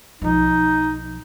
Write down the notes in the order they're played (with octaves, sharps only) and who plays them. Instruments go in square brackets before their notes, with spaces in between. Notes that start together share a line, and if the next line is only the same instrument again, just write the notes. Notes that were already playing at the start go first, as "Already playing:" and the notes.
[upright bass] B1 F3 [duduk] D#4